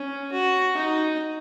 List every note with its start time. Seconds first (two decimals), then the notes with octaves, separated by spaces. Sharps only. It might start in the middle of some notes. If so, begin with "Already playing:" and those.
Already playing: C#4
0.32 F#4
0.77 D#4